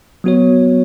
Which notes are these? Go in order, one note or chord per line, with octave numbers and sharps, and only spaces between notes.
F#3 B3 F#4 C#5